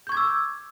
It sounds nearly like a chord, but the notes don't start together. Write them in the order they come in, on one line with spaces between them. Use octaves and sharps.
G6 C#6 G#6 D6 E6